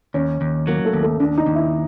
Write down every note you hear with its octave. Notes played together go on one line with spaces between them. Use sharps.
D#2 C#4
D#2
F#3 A#3
A3
D#2
A3
D#2 D4
D#4
D#2
E4